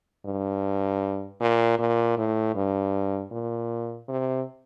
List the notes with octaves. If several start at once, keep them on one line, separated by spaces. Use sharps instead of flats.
G2
A#2
A#2
A2
G2
A#2
C3